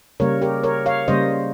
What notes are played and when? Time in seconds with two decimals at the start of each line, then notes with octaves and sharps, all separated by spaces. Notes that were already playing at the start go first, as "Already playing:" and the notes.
0.20 C#3 G3 A#3 A#4 C#5
0.42 G4 A#4
0.64 A#4 C#5
0.86 C#5 F5
1.08 C#3 G3 A#3 C5 D#5